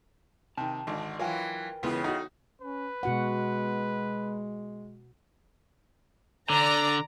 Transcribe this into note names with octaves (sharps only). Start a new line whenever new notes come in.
C3 D#3 A5
G#1 D3
E3 F#3 F4 A#4 B4 G5 G#5
C#2 A2 C#3 E3 B3 F4
D#4 F#4 A4 D#5 F#5
C#4 B4
B2 G#3 F#4 F#5
D3 D5 A#5